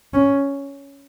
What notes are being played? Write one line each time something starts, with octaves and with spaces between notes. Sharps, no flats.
C#4